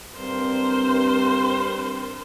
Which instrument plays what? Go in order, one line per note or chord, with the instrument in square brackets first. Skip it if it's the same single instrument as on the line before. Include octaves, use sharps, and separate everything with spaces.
[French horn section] G2 C4 [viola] A#4 C5